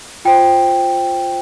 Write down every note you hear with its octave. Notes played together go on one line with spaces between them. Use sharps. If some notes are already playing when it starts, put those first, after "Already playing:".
F4 C5 G5